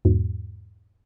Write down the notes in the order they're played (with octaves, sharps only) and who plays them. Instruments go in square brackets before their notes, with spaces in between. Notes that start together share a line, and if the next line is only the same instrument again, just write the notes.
[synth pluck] E2 G#2 B2